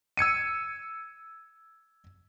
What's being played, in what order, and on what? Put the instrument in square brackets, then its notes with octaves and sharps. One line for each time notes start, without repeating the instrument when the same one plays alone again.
[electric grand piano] E6 G#6 C#7 D#7